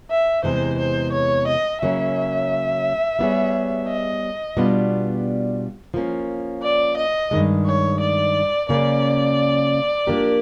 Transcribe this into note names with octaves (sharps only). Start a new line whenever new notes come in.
E5
E2 C3 E3 G#3 C5
C5
C#5
D#5
C#3 F#3 A#3 C#4 E5
G3 B3 E4 G#4 C#5
D#5
B2 G3 B3 D4 F4
F3 A#3 C#4
D5
D#5
G2 D#3 G#3
C#5
D5
C#3 F#3 A#3 C#4 D5
F3 A#3 D4 G4 A#4